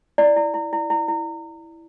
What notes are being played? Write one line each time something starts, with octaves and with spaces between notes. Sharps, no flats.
E4 D5
E4
E4
E4
E4
E4